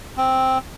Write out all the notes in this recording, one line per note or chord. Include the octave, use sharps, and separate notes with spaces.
C4